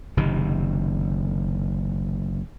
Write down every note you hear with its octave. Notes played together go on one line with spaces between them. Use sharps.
F#1 C3 D#3